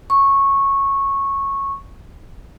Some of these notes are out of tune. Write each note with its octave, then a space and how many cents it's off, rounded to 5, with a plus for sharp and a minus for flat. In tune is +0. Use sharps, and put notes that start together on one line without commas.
C#6 -10